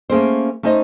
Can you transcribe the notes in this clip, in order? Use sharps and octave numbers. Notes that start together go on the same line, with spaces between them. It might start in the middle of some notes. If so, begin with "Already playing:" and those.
A3 A#3 C#4 G#4 A#4 C5
A3 C#4 D#4 C5 D#5